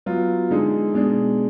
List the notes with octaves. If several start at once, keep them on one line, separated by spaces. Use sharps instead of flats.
F#3 B3 F4
D3 G#3 D#4
B2 G#3 D4